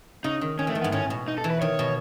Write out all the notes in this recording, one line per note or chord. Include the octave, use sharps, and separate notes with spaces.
C#3 D#4
D#3
D#3 C#4
E3 A3
D#3
B3
G#2
A2 C#4
B2
D#4
A4
E3
B4
D#3 C#5
B2